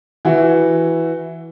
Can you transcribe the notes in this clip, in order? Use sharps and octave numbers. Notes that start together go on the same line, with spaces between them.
E3 E4 F#4